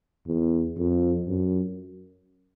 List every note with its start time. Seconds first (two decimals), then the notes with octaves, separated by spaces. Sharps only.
0.27 E2
0.77 F2
1.27 F#2